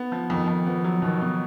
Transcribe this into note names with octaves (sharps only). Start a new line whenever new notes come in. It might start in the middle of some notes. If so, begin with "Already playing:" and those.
Already playing: B3
F3
F2 D#3
F2
F3 B3
F#3
B2 D#3
B2